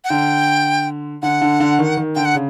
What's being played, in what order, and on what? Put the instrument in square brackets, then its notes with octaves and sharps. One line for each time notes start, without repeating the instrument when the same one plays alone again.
[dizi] F#5
[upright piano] D3 [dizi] G5
[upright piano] D3 [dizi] F#5
[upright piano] D3
D3
D#3
D#3
[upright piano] D3 [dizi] G5
[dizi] F#5
[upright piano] C#3